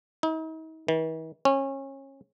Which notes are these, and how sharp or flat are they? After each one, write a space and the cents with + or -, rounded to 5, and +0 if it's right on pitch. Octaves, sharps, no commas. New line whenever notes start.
D#4 +45
E3 -45
C#4 -25